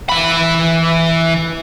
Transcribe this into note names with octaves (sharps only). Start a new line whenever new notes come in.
E3 B5